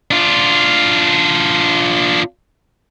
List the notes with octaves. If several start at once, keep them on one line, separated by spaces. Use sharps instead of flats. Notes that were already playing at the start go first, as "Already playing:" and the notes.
D4 F4